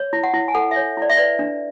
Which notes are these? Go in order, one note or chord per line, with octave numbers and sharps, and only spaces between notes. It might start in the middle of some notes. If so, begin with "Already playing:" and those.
Already playing: C#5
E4
F#5
E4
G#5
A4 F#5
E5
C#5
E4 D5
E5
B4 D5
D4